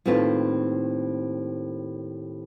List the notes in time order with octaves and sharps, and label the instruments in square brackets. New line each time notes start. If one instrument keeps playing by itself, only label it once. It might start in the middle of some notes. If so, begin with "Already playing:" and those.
[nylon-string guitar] D#2 A2 C4 F4 B4 A5